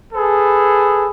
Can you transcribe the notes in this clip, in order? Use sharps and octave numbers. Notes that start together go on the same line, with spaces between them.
G#4 A4 B4